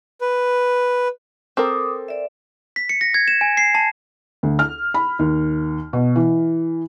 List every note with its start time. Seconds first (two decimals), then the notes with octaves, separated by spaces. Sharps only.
0.21 B4
1.57 C4 A4 A#4 D6 D#6
2.08 D5 E5
2.76 B6
2.89 C#7
3.01 A#6
3.14 G#6
3.28 E7
3.41 G#5
3.57 C7
3.75 A5
4.43 D2
4.59 F6
4.94 B5
5.19 D#2
5.93 B2
6.16 E3